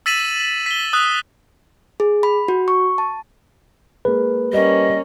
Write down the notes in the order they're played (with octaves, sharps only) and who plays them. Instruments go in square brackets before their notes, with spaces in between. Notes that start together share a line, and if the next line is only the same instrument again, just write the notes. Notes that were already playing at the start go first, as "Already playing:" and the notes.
[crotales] E6 A6 B6 D#7 E7 F#7
B6 G7
D#6 F#6
[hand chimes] G#4
B5
F#4
C#6
A5
[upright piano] G#3 A#3 [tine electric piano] B4
[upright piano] G3 [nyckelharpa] A#3 C#4 [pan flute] D#5